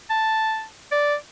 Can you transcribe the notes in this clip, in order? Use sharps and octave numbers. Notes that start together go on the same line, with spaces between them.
A5
D5